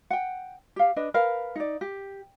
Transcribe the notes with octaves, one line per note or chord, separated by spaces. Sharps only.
F#5 G5
G4 F5
D4 B4 D#5
A#4 B4 F5
D#4 D5
G4